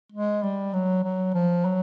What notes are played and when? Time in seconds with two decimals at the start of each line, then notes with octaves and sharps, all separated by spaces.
0.12 G#3
0.43 G3
0.73 F#3
1.04 F#3
1.34 F3
1.65 F#3